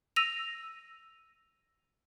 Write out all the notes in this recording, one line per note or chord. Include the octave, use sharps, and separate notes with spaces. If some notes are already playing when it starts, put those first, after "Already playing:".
E6 A#6 D#7 F7